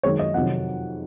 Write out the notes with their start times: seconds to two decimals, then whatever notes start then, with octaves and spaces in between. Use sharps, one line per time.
0.03 F#2 D#3 G#3 C#5
0.19 D#5
0.34 F2 C3 D#3 F#3 F#5